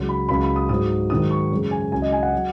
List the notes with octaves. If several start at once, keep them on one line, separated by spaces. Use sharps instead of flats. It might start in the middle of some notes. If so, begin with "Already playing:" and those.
Already playing: C#2 C#3 F#3
B5
C#2 C#3 F#3 B5
B5
D#6
G#2 F#3 D#6
G#2 D#3 F#3 D#6
C#6
F#2 C#3 G#3
G#5
C#2 C#3 F#3 G#5
D#5
G#5
F#5
F#3